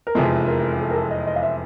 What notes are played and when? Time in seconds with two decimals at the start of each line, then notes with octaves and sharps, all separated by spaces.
0.07 A#4
0.15 F1 E2 C3 F3 G#3 A4
0.47 A#4
0.79 A4
0.90 A#4
0.94 A4
1.11 D#5
1.27 D#5
1.36 F5
1.43 E5